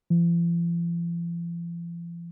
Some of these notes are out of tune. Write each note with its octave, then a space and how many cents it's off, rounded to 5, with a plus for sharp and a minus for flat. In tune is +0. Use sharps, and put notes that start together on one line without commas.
F3 -45